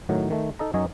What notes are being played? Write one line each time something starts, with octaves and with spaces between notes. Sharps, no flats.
A2 D#3 F#3
D#3 A3
D#4 A4 D#5 A#5
F#2 F#3 D#4 C#5 D#5 G#5